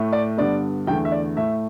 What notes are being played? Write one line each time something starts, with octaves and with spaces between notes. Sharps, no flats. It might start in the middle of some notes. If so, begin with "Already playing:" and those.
Already playing: A2 A3
D5
G2 D3 B3 D5
E2 D3 A3 G5
E5
D5
A2 A3 E5